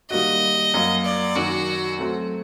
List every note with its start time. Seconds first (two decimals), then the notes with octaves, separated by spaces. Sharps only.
0.11 D#3 G3 A#3 F#4 D#5
0.74 F#2 F#3 A#3
1.05 D5
1.35 F#2 D#3 F#3 F#4
1.98 F#3 A3 C4